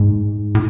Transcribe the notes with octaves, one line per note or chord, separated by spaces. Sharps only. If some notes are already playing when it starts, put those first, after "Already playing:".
Already playing: G#2
A2